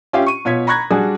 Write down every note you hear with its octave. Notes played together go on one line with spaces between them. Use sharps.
C#4 F4 G4 E5 F5 G5
C#6 D#7
B2 F4 C#5 G#6 B6
A#5 B5 C#6 F#6 G#6 A#6
G3 D4 F#4 G#4 D5